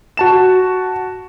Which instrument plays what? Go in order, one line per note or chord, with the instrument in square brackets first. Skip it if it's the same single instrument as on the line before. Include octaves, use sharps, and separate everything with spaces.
[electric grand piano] F#4 A5 E7